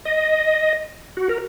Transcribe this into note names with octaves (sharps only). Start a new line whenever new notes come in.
D#5
F#4
A#4